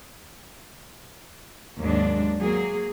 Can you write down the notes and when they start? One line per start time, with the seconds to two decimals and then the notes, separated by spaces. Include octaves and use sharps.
1.79 D#2 G#2 F#3 G#3 D4
2.39 F#3 A#3 G#4